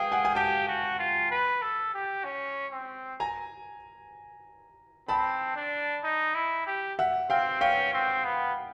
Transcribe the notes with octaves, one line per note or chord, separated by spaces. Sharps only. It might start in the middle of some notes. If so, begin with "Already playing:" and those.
Already playing: G#4 F5 G5
F#5 G#5
G#5
G4 G5 A5
F#4
F4
B4
A4
G4
C#4
C4
G#5 A#5
C4 A5 B5
D4
D#4
E4
G4
E5 F#5
C4 F5 G5
C#4 F5 G5
C4
B3